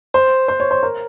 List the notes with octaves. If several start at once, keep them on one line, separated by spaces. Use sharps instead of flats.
C5
C5
C#5
C5
A#4